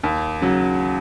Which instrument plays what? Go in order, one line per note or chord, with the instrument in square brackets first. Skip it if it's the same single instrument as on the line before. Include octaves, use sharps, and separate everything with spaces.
[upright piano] D#2
C#3 F#3